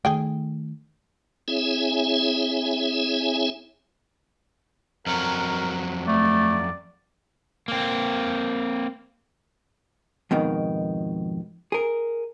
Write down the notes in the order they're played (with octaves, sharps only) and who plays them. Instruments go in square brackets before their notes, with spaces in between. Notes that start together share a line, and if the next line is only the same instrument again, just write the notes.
[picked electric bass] D#3 A3 [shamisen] G#4 G5
[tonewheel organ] C4 E4 G#4 C#5 E5 G#5
[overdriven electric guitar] F2 F#3 [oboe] A#4
[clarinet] A3 [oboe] D5
[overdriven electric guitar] A#3 C4
[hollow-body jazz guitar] F2 G#2 B2 D#3
G#4 A#4